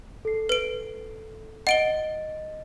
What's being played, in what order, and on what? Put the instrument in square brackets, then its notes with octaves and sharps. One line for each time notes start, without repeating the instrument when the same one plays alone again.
[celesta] A4 C7
[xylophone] B4 D7
[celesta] D#5 A6 [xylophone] F#5 D7 G7